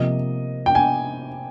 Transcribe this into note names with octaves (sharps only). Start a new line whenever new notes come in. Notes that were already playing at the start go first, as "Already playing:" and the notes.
Already playing: C3 F3 A#3 D#5
G5
G#5